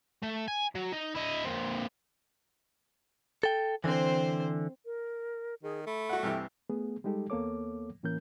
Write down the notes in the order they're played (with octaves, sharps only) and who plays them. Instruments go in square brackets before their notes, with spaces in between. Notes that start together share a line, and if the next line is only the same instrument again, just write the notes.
[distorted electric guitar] A3
G#5
F#3
D#4
E4 D#5
A#3 C4
[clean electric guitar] A4 G5
[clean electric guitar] D3 E3 [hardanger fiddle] C4 C5
[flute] A#4
[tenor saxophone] D#3 [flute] G#4
[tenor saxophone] A3 [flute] B5
[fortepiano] F#4 F#5
[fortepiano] G2 C3 E3 [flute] G5
[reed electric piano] A3 B3 G#4
G3 G#3 D#4 G4 A4
D#2 A#3 B3 A4 C#5 D6
A2 E3 A#3 C#4 A#4 G6